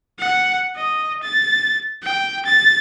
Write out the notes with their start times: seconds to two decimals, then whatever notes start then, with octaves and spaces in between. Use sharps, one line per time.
0.19 F#5
0.76 D#5
1.23 A6
2.03 G5
2.45 A6